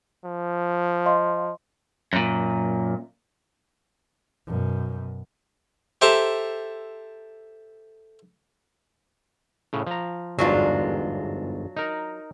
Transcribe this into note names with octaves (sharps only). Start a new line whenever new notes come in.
F3
D#5 F5 C6
F#2 A#2
F#2 B2
G4 A4 C5 E5 A5 A#5
A2 C#3
F3 A#5
G1 E2 G#2 F#3 D4 F4
D#4 A#4